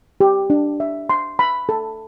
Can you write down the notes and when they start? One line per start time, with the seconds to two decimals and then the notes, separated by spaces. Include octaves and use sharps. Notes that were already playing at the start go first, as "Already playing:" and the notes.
0.20 G4
0.50 D4
0.80 E5
1.10 C6
1.39 B5
1.69 A4